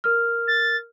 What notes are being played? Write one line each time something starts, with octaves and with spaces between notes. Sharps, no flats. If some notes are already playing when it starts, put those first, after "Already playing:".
A#4 F6
A6